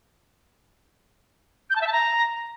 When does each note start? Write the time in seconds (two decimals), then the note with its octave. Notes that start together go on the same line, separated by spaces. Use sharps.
1.70 G6
1.75 A5
1.81 E5
1.86 A5
1.92 A#5